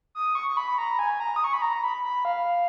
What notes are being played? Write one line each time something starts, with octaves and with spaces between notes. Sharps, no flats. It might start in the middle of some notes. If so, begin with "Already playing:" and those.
D#6
C#6
C#6
B5
A#5
G#5
A#5
D#6
C#6
B5
A#5
B5
B5
F5